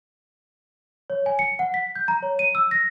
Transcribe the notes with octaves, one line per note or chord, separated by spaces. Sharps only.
C#5
G#5
C#7
F#5
B6
G6
A#5
C#5
D#7
E6
A#6